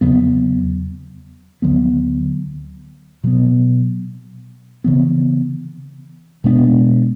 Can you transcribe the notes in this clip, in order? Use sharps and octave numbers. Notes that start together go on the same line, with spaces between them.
E2 C#3 F#3 B3
D2 D3 F#3 B3
B2 F#3 B3
C#3 E3 B3
B2 G#3 B3 D4